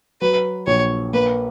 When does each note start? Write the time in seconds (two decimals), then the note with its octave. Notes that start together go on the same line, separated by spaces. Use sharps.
0.21 F#3 B4
0.67 A#1 C#5
1.13 A#3 B4